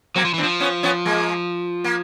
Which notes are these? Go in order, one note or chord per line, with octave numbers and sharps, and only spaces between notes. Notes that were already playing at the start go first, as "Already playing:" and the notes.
F#3 A#3 C4
F3
E3
C4 D4
F3
B3 C#4
B3 C#4
G#3 A#3
A#3